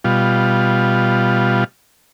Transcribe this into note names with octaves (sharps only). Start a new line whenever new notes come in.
B2 G3 F4